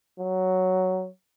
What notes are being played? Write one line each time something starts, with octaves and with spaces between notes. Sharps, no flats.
F#3